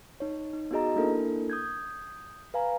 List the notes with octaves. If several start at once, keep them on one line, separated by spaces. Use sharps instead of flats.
D#4 C#5
D#4
B3 D#4 F#4 G#4 D#5 A#5
A#3 D4 E4 A4 A#4
D#6 G6 G#6
B4 F5 G#5 A#5